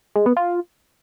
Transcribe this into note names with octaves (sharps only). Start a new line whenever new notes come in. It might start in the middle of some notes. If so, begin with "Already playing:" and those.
G#3
B3
F4